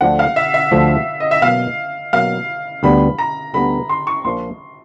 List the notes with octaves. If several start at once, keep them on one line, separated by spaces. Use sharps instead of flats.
D2 D3 F3 A3 D4 F#5
F5
E5
E5
D2 D3 F3 A3 D4
D#5
E5
B2 F#3 A#3 F5
B2 F#3 A#3 F5
D2 D3 G3 B3 B5
A#5
D2 D3 G3 B3 B5
C6
C#6
A#1 A#2 F3 C6